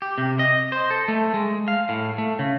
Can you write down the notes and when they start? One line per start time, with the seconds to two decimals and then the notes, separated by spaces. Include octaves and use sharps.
0.02 G4
0.18 C3
0.39 D#5
0.72 C5
0.91 A4
1.08 A3
1.34 G#3
1.68 F5
1.89 A2
2.18 A3
2.39 C#3